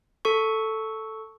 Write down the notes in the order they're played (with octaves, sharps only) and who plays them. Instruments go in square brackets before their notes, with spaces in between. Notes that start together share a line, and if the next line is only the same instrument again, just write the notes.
[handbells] A4 C#6